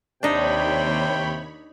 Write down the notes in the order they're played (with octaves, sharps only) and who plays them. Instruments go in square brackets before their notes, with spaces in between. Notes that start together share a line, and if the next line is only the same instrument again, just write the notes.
[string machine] D#2 C#5 B5 [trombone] C3 [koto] D4 D#4 [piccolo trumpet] G5